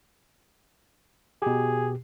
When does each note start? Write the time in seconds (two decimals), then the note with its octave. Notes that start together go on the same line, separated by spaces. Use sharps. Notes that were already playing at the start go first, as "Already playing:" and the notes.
1.42 B2 G4 G#4